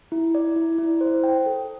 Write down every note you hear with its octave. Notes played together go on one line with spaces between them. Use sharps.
E4
D5
E4
E4
C5
G5
A4